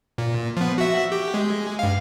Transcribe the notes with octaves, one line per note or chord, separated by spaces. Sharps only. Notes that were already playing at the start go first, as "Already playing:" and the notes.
A#2
F3 B3
F#4 E5
G4
G#3
G2 F5